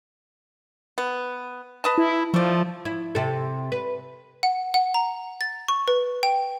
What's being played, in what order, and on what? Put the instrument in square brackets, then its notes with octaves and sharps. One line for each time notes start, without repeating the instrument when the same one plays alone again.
[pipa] B3
B4 D#5 A5
[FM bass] E4
[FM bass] F3 [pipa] A3 D5
[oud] E4
C3 A4
B4
[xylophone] F#5
F#5
A#5
A6
C#6
B4
G5